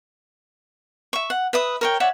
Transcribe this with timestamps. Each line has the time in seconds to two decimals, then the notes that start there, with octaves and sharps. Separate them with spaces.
1.13 E5 C#6
1.30 F#5
1.53 B4 E5 D#6
1.81 A#4 C#5 G5
2.00 C#5 D5 E5 F#5